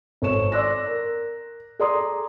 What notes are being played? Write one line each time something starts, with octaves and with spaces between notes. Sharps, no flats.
G#1 A4 C5 C#5 C#6 E7
D5 C6 D6 E6 F#6 A#6
A#4
G#4 A4 D5 A#5 C6 D#6